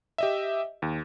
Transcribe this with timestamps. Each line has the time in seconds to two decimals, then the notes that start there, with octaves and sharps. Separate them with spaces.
0.18 G4 D#5 E5
0.82 D#2